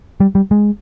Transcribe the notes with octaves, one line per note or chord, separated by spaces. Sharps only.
G3
G3
G#3